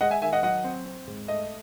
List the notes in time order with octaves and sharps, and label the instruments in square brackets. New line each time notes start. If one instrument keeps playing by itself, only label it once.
[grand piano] G#3 D#5 F#5
E5 G#5
D#3 E5 G#5
D#5 F#5
F#3 D#5 F#5
C4
C4
G#2
A3 D#5